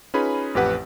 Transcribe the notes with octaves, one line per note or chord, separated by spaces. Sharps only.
C#4 D#4 F4 G#4 B4 B5
A1 F2 G4 B4 F#5